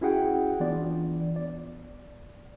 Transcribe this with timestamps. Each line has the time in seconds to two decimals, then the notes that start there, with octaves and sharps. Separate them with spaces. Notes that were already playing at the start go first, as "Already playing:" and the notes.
0.01 C#4 E4 F#4 G#4 F#5 G5
0.60 E3 B3 D4 F4 D5
1.36 D5